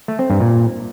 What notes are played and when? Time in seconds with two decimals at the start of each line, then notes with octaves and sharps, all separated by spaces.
0.08 A3
0.19 C4
0.30 G2
0.40 A#2